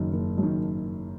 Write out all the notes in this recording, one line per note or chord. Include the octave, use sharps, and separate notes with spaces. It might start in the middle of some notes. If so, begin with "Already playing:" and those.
Already playing: F#1 F#2 D#3
F#1
F#2 D#3